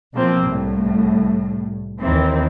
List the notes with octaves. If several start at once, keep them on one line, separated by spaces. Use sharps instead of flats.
B2 F3 A#3 C4
C2 A2
D#2 D#3 E3 C4